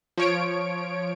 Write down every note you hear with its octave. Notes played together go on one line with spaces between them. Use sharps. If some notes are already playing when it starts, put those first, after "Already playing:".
F3 C#5 D7